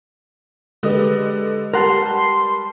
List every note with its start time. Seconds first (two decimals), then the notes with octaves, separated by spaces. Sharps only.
0.83 D3 G#3 G4 B4 D#5
1.74 G3 A#4 F#5 A5 C6